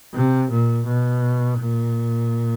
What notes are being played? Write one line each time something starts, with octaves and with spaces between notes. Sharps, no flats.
C3
A#2
B2
A#2